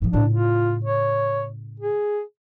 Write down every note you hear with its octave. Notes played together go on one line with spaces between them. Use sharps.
G#2 F3
A2 C#3 D4
F4
C#5
G#4